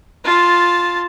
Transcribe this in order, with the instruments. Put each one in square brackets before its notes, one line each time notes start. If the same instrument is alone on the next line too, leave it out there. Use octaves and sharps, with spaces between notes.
[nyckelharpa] F4 A5